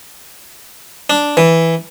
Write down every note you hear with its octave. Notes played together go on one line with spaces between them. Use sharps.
D4
E3